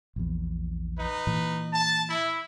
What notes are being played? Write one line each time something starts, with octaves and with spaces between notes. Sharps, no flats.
A#1 E2
D#4 B4
A#2 E3
A5
E4